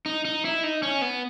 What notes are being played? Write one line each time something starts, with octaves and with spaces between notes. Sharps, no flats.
D#4
D#4
E4
D#4
C#4
B3